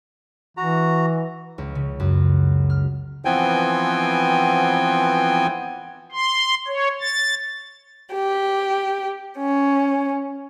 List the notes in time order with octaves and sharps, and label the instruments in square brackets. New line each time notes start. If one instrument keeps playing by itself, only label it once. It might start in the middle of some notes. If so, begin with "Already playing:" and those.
[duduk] E3 [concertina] F#4 A#5
[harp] C#2
C#3
F#2
F6
[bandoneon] E3 F3 B3 C4 G5 G#5
[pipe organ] C6
C#5
A6
[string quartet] G4
C#4